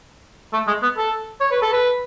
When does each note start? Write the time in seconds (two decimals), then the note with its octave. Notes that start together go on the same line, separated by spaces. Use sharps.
0.53 A3
0.67 G#3
0.82 B3
0.97 A4
1.40 C#5
1.51 B4
1.62 A4
1.73 B4